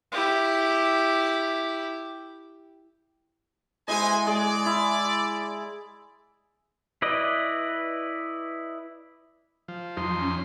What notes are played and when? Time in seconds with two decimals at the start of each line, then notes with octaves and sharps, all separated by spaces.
0.12 E4 G4
3.88 G#3 B3 E4 C5 D#5 G#5
4.27 G#3 G#4 D5
4.66 E4
7.02 E4 B4 D5 D#5
9.68 F3
9.97 F2 F3 D#4 C6
10.19 C#4